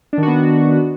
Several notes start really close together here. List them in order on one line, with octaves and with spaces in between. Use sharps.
D4 D#3 F#4 B3